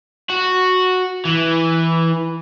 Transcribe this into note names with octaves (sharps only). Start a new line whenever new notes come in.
F#4
E3